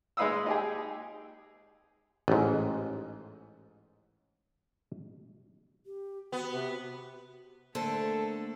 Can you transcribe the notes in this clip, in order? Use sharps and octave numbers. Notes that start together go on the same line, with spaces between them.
G#3 D#4 B4 F5 D#6 E6
D#4 G4 G#4
A1 G#2
G4
B3 F#4
C3
D3 A3 A#3 A4 C5